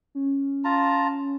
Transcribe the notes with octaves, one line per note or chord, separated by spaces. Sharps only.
C#4
F4 A5 A#5